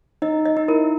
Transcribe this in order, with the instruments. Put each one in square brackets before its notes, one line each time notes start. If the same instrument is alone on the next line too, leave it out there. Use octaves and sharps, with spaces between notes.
[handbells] D#4 [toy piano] D#5
[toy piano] D#5
[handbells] D#4
[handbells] E4 [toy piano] A#4